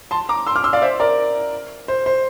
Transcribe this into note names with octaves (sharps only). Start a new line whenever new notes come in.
A5 C6
A#5 D6
C6 E6
D6 F6
C6 E6
D5 F5
C5 E5
A#4 D5
C5
C5